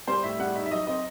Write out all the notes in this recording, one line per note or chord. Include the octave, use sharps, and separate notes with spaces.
G3 C5
A2 E5
G3 F#5
D#4 E5
E5
F#3 D#5
C4 D#5